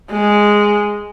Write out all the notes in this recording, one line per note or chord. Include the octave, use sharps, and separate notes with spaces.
G#3